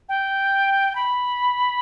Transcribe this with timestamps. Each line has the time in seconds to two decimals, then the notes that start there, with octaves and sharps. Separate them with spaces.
0.09 G5
0.95 B5